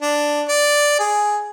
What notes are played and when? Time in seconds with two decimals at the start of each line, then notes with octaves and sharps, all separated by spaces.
0.02 D4
0.48 D5
0.99 G#4